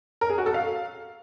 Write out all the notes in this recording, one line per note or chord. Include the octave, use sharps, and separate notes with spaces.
A#4
G#4
F#4
A4
F5